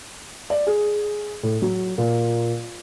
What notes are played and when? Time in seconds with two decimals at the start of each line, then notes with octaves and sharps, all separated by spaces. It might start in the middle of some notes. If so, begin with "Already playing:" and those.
0.50 D5
0.67 G#4
1.43 A2
1.62 F#3
1.98 A#2